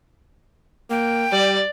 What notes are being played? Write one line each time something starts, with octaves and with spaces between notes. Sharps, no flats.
A#3 G5
G3 D5